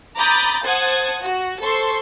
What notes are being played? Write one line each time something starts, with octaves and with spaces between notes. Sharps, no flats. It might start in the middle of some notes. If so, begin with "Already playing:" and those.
A#5 B5 D6 D#6 G6 A6
C5 F#5 A5 D#6 G#6
F#4
A4 C5 C6 C#6